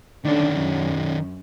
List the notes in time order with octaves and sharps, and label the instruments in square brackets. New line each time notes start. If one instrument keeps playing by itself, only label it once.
[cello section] D3 D4 [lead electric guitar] D#3 C#4
[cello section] F#2